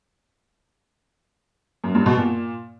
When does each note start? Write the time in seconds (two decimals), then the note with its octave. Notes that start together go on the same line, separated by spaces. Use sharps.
1.84 F#2
1.95 G2
2.06 B2
2.17 A#2